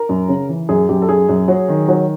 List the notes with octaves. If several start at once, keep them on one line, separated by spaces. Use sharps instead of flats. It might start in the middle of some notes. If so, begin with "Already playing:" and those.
Already playing: A#4
F#2
C#3
E3
F#2 G#4
F#2 G4
A4
F#2 G#4
F#2
F#3
D#3
F#3